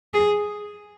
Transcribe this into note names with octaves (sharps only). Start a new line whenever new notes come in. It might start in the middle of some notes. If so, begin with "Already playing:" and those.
G#4